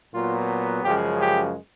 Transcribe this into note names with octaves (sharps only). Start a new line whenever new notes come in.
A#2 F#3 B3 F4
F#2 C#3 F3 G#3 G4
G4